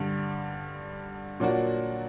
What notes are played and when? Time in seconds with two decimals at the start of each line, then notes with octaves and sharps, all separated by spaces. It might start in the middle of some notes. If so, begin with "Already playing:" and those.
Already playing: G2 D3 G3
1.40 A#2 F#3 A#3 D4 F#4